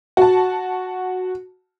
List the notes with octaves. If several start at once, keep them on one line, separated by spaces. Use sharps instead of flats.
F#4 A5